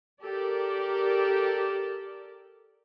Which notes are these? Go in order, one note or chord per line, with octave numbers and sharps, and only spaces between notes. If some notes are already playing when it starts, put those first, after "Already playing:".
G4 A4 A#4 D5